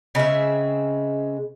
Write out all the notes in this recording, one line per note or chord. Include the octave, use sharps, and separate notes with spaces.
C#3 G#3 C4 E5